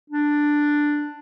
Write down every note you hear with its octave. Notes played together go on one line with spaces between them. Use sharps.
D4